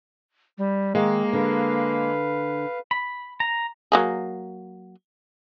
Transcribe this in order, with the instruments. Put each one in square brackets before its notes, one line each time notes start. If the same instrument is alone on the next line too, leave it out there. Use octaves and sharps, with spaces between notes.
[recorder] G3
[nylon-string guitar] D#3 F5 [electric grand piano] G#3 [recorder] A#3
[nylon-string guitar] D3 [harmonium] B4 F5
[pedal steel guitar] B5
A#5
[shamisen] F#3 A#3 G#4